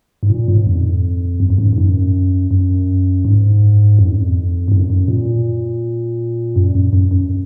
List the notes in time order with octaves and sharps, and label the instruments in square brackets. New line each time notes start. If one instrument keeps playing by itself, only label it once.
[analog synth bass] G#2
A#2
G#2
F2
F#2
F#2
G#2
G#2
F#2
F#2
G#2
F#2
F2
F2
G#2
F#2
F#2
A#2
F#2
F#2
F#2
F#2